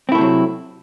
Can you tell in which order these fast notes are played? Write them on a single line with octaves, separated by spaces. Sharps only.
C4 E4 A3 C3 F#3